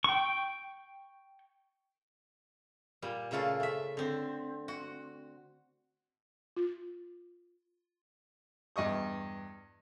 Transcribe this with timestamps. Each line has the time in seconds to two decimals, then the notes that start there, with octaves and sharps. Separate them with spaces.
0.04 G5 C#6
3.02 A#2 G3
3.31 A#2 C#3 A3 F4 A4
3.60 A3 E5
3.97 D3 C4
4.68 F#4
6.56 F4
8.76 E2 G2 D#5 C#6 D#6